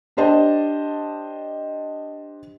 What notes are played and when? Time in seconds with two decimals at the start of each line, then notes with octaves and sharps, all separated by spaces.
0.17 D4 G4 C5 D#5 A5